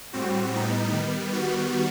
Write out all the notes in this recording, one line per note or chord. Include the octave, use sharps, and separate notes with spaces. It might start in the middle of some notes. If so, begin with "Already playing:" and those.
A2 G3 C4 F#4
A2 G3 B3 D#4
D#3 G3 B3
D#3 G3 B3 F#4